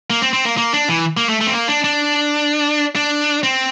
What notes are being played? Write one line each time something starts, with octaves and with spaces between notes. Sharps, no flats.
A#3
C4
C4
A#3
A#3
D4
E3
A#3
A3
A3
C4
A#3
D4
D4
D4
C4